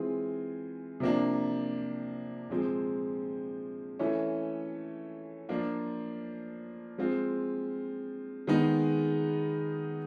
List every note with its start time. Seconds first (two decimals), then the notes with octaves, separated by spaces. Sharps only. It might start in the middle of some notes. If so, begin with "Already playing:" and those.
Already playing: E3 G#3 C4 F4 G#4
1.00 C3 F3 A#3 D4
2.49 A#2 F3 G#3 C4
3.99 E3 A3 C#4
5.49 F3 A#3 D4 F4
6.98 F3 G#3 C4 F4
8.47 D#3 G#3 B3 D#4 G#4